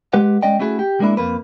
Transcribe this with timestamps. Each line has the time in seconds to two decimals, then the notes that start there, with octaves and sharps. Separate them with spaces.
0.13 G#3 G4 B4 F#5
0.43 G#3 C#4 D5 D#5 G5
0.60 A3 C#4 E4 F#4 G#4
0.79 G4
1.00 G#3 A#3 D4 E4
1.17 F2 A#3 B4